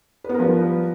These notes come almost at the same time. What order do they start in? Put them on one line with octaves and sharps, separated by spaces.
B4 B3 A#4 F3 G3